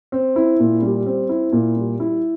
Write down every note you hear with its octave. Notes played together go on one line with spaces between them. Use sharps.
C4
E4
A#2
G3
C4
E4
A#2
G3
E4